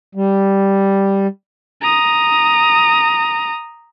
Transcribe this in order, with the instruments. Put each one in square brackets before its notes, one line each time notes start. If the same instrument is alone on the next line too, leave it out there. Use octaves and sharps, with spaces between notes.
[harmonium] G3
[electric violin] A#5 D#6